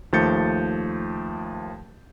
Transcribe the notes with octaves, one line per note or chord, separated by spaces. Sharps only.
D#2 F3 A3 G6 A6 C#7